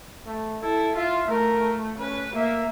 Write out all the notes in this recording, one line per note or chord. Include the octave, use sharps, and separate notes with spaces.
A3
E4 A4
F4 E5
A3 A#4
C#4 B4
A#3 E5